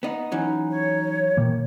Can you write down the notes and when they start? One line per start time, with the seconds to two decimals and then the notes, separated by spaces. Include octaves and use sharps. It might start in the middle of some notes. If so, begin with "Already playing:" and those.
0.03 B3 D#4
0.32 E3 F#3 C#4 D#4
0.70 C#5
1.37 A#2 D#3 E3 A#3